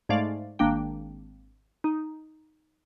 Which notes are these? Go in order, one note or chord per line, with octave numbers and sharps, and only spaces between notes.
G#2 G#3 A3 D5 F5
G#1 A#3 D4 G5
D#4